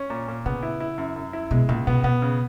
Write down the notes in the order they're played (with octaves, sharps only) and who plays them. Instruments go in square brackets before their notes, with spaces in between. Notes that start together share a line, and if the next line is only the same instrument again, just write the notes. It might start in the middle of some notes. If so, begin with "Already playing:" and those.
Already playing: [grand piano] C#4
A#2
A#2
[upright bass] C#3 [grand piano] B3
[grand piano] E4
E4
F#2
F#2
E4
[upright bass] B2 [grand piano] G#3
[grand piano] C#2 [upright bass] A#2
[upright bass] B2 [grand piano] B3
[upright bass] B2 [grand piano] B3
[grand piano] C#3